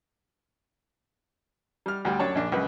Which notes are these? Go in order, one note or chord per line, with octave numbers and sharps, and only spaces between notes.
G3 F6
D2 G3 G5
F#2 D4 C#5 D5 A5
A#1 D4
C#2 F#2 B4